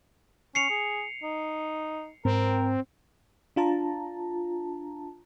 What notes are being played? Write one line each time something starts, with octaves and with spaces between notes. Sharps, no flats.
C#4 C7 C#7 F7
G#4
D#4
G#2 C4 A#4
D4 F4 A5 A#5